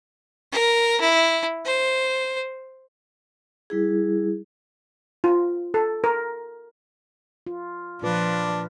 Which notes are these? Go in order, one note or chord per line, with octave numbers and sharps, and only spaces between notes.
A#4
E4
C5
G3 E4 G#4
F4
A4
A#4
F4
A#2 F3 D4 F4 B4